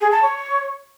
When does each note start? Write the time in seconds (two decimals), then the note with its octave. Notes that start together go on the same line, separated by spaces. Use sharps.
0.01 G#4
0.11 A5
0.22 C#5